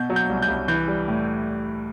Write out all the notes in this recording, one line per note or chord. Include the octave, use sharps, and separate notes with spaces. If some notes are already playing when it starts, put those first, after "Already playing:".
Already playing: B2 G6
F#3
G6
C2
G6
C2
E3 G6
G3
A2